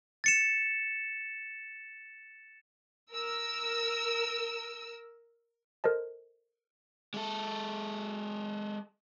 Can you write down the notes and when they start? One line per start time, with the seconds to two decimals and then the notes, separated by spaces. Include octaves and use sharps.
0.24 A6 C#7 E7
3.12 A#4 E6
5.84 A4 A#4 C5 D#5 A5
7.14 G#3 A4